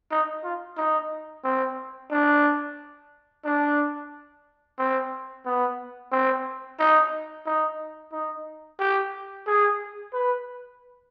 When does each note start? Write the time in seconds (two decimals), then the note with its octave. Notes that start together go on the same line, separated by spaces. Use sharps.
0.11 D#4
0.44 F4
0.77 D#4
1.44 C4
2.11 D4
3.45 D4
4.79 C4
5.46 B3
6.12 C4
6.79 D#4
7.46 D#4
8.12 D#4
8.79 G4
9.47 G#4
10.13 B4